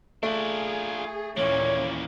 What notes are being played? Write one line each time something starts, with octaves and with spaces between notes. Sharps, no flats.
A3 D4 F4 G#4
D#2 A#2 E3 A#3 C#4 C#5